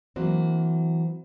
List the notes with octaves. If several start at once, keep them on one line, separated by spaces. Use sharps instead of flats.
E3 F#3 A#3 C4